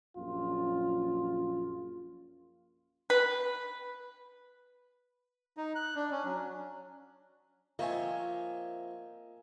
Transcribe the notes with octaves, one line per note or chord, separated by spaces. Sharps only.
A#1 F#2 F4
B4
D#4
F#6
D4
C#4
F#3
F3 A#3 C4 C#5 D#5 E5 G#5